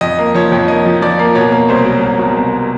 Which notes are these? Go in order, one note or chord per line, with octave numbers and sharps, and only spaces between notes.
F2 D#5
A#3
F3 C#5
F2
A#3 D#5
F3
F3 D5
A#3
B2 C#5
A#3
C2 C5
F#3
C2
B2
C2